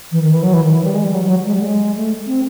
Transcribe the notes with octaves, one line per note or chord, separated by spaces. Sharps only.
E3
D#3
E3
F#3
E3
D#3
E3
G3
G#3
G3
F#3
F#3
G#3
G3
A3
G#3
A3
C4